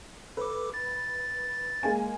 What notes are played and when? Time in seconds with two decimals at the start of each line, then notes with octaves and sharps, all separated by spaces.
0.37 A4 B4 D6
0.74 A6
1.83 G#3 A#3 G#5